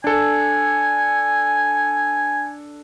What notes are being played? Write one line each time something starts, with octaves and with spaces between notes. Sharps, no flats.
D4 A4 G#5